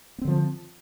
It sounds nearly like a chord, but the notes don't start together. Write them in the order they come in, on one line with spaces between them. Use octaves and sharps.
B3 C4 D3 F3